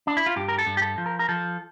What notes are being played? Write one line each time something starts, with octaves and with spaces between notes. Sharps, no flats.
D4
E4
F4
G2 G4
A#4
A4
G2
G4
A4
F3
A#4
A#4
F3 A4